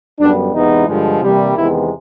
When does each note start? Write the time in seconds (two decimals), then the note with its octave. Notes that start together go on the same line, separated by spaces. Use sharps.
0.19 F#2 D3 G3 B3 D4
0.53 E2 C3 E3 G#3 B3 D#4
0.87 G2 D3 F3 G#3
1.21 C3 E3 G3 A#3
1.55 E2 C3 D#3 G#3 B3 E4